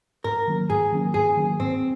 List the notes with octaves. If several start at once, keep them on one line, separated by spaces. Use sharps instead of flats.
G#2 A#4
D#3 F#3 A#3 C#4
G#2 G#4
D#3 F#3 A#3 C#4
G#2 G#4
D#3 F#3 A#3 C#4
G#2 C4